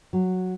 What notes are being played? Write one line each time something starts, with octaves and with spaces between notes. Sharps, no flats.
F#3